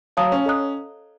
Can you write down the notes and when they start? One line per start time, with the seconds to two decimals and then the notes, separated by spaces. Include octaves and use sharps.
0.17 F#3 C#5 F5 A5 D#6
0.32 C#4
0.46 A4 D#5 A#5 D#6 F#6